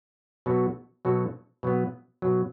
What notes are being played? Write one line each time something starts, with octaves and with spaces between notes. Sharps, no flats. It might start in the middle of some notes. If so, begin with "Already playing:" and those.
B2 F#3 B3 F#4 A4
B2 F#3 B3 F#4 A4
B2 F#3 B3
B2 F#3 B3